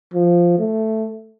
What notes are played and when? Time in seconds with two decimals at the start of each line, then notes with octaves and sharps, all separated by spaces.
0.13 F3
0.59 A3